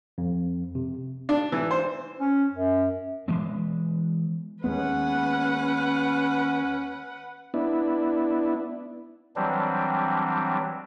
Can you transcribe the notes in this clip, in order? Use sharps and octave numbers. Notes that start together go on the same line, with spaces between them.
F2
C3
D4
E3
C5
C#4
F#2
E3 G#3 B3
D#2 G#3 B3 C#4 B4 F#5
B3 D4 E4
E3 F#3 G3 C4 D4